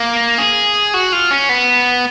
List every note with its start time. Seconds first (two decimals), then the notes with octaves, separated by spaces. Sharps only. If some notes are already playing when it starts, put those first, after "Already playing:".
Already playing: A#3
0.38 G#4
0.94 F#4
1.12 F4
1.31 C#4
1.49 B3